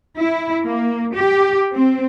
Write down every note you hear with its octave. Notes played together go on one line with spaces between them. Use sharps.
E4
A#3
G4
C4